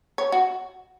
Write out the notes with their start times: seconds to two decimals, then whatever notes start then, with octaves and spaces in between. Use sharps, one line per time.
0.18 C#5
0.32 F#4